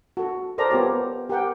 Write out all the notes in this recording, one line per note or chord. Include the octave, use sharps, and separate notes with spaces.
F#4 A4
A4 A#4 C5 D5 A#5
B3 F4 G4 C#5
G4 A#4 F#5 G5